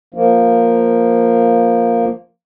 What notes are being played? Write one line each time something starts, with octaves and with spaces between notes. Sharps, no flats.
F3 A#3